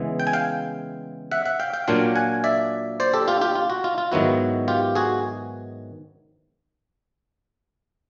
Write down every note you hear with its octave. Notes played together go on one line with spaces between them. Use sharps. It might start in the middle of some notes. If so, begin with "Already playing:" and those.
Already playing: C#3 E3 G#3 B3 E4
G5
G#5
F5 G5
E5 F#5
E5 F#5
F5 G5
F5 G5
A#2 F#3 A#3 D4 F4 F5 G5
F#5 G#5
D5 E5
C5 D5
G4 A4
F4 G4
F4 G4
F4
F#4
F4
F4
G#2 D#3 F#3 B3 E4 F#4
F4 G4
F#4 G#4